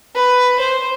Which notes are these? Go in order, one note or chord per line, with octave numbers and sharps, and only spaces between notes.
B4
C5